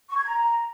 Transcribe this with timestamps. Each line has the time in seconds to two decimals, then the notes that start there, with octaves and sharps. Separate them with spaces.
0.09 C#6
0.17 G#6
0.24 A#5